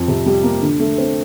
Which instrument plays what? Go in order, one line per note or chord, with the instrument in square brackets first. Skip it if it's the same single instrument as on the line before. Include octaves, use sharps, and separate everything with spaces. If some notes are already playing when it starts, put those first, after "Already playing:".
Already playing: [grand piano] F2
C3
G3
A#3
D3
A3
C4